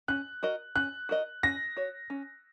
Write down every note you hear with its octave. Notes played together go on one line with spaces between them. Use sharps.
C#4 F#6
F#4 A#4 D#5
C#4 F#6
F#4 A#4 D#5
C#4 A#6
F#4 C#5
C#4